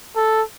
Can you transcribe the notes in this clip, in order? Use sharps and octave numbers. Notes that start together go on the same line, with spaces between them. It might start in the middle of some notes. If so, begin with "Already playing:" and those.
A4